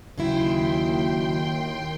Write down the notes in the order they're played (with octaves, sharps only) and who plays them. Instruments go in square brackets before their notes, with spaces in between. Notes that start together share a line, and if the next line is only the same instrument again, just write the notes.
[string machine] D#2 G5 C6 [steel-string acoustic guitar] C#3 F#3 E4